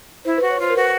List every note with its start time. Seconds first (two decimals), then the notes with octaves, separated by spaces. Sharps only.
0.25 E4 C5
0.38 B4
0.42 F#4
0.51 C#5
0.59 F4 C5
0.70 A#4
0.75 F#4 B4